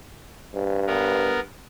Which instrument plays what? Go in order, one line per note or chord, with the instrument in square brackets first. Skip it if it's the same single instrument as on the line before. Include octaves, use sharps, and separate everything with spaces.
[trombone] G2
[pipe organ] B3 A#4